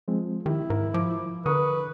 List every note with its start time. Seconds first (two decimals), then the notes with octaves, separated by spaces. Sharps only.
0.08 F3 G#3 C4
0.46 D#3 E4 G4
0.70 G#2 A#4
0.94 F3 D6
1.46 D3 A#4 B4 C#6 D#6